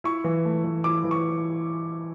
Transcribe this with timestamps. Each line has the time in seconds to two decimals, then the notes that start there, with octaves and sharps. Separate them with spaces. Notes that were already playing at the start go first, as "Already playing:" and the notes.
0.04 E4 C#6
0.24 E3
0.45 A3
0.64 E3
0.84 E4 D6
1.04 E3
1.11 C#6